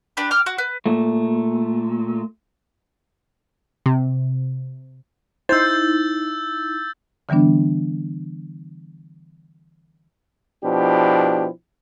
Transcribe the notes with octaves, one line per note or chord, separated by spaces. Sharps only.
D4 G4 B4
G5 D6 F6
F#4 F#5
B4
A#2 A3
C3
D#4 E4 C5 E6 G6 A6
D3 E3 G3 B3 D4
B2 F3 D4 E4 G4